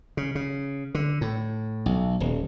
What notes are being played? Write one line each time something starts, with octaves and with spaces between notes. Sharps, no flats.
C#3
C#3
D3
A2
B1
D#1